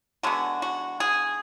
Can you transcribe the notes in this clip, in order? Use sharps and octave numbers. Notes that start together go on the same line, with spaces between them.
D3 G#3 B3 F#4
F#4
G#4